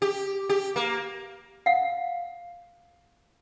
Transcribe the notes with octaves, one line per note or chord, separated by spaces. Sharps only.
G4
G4
A#3
F5 F#5